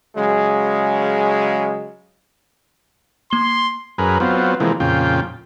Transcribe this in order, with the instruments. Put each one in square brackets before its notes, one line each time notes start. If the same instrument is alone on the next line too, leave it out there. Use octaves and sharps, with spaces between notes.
[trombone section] C#3 F#3 G#3
[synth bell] A#3 G7 [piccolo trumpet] C6
[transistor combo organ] F#2 G#4 A#4 B4
F#3 B3 C4 F4
C3 E3 F3 G#3 A#3
F2 A#2 C#3 F4 G5